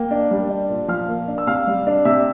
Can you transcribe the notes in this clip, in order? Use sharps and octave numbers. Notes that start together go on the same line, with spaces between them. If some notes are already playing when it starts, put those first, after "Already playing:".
Already playing: A#3 G5
D4
G3
D4
A#2
F3 F5 F6
A#3
D4
E6
C3 F5 F6
G3
D4
C3 E5 E6